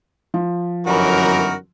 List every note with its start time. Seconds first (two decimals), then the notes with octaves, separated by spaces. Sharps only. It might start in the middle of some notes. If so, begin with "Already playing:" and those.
0.34 F3
0.87 G1 F#2 E3 D#4 F#4 A#4